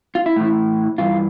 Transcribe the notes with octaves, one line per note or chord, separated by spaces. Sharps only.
F4
E4
A2 E3
G2 E3 F4